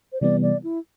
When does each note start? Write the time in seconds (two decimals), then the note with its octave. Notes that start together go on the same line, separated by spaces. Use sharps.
0.12 C5
0.21 C3 E3 G3 B3 D5
0.42 D5
0.64 E4